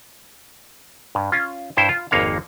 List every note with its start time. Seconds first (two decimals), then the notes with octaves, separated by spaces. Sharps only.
1.15 G2
1.32 C#4 F4
1.77 G2 E4 C5 G5 A5
1.89 F4
2.11 G#1 F2 A#3 C#5 F5